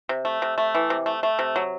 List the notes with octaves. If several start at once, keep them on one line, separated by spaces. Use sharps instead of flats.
C3
A3
C3
A3
E3
C3
A3
A3
C3
F#3